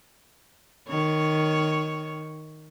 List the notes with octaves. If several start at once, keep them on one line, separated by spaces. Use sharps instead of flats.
D#3 C#5